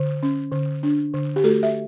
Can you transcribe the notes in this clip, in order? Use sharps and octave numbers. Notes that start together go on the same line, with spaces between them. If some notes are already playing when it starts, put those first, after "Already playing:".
Already playing: D3
C#4
D3
D4
D3
G4
A3 F#4 A4
E5